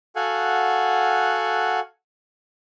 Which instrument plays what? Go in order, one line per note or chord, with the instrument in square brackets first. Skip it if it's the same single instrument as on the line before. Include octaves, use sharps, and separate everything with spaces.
[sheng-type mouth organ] F#4 A4 F5 F#5 G#5